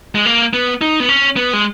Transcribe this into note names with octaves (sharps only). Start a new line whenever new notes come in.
G#3
A#3
B3
D#4
B3
C#4
B3
G#3